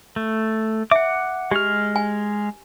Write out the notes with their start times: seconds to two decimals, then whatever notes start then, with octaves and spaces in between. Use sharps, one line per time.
0.16 A3
0.91 E5 F#5 D6
1.51 G#3 G4 F6
1.96 G#5